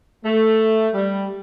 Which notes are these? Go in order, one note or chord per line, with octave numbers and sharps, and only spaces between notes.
A3
G3